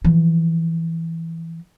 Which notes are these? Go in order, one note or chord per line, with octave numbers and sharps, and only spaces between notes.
E3 F3